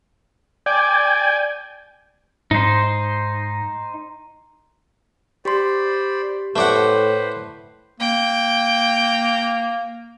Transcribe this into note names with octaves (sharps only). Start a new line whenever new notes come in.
D5 G5 G#5
G#2 D#4 C5
G4 C5 D5 B5 C6
A2 A3 B4 C5 D5 F#5
A#3 G5